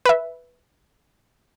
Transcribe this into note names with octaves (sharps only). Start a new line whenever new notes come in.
B4 E5